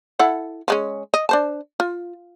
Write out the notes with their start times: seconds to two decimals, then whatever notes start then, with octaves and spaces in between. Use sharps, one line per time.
0.19 E4 A4 F#5
0.68 F3 G#3 C#4
1.14 D#5
1.29 D4 C5 A5
1.80 F4